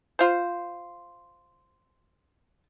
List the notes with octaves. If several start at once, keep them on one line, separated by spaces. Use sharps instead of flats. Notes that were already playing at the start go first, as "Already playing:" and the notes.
F4 C5